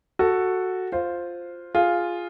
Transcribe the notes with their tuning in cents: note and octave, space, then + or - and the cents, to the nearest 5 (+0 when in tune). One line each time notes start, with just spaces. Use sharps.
F#4 +0 A4 +5
F4 +0 C5 +0
F4 +0 G#4 +0